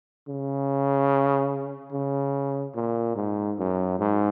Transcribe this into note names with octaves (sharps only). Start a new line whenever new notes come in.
C#3
C#3
A#2
G#2
F#2
G#2